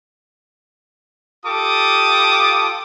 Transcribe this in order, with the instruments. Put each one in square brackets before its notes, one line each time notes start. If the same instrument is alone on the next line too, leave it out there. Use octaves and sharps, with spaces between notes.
[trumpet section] F4 G4 A4 A5 D6 D#6